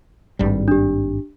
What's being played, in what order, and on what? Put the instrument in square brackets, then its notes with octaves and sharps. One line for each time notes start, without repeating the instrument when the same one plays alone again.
[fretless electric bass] G#1 G2 G3
[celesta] D4 G4